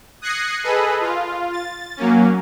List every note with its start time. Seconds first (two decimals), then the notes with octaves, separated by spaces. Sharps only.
0.21 D#6 F#6 G#6 A#6 C7 C#7
0.64 G#4 A4 B4 D#5
1.01 F4
1.52 A6
1.97 F#3 A#3 C#4